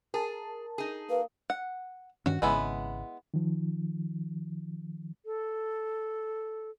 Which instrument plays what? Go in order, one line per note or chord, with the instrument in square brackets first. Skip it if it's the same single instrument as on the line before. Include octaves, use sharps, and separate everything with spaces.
[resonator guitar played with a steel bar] G#4 [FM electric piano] A#4 A5
[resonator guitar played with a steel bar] D#4 G#4
[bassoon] A#3 [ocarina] B4
[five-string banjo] F#5
[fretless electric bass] G2 D#3 C#4 [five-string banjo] F#4
[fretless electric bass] G#1 C#3 [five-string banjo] G#3 B3 E4
[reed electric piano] D#3 F3
[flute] A4